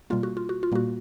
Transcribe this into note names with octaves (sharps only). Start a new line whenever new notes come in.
B2 G3 A#3 F4
F#4
F4
F#4
F4
A#2 G3 A#3 F#4